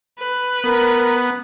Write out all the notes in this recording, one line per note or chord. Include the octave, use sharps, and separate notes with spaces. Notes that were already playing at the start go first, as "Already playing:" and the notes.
B4
B3 A#4